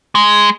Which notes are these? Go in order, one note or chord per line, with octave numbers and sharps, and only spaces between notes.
G#3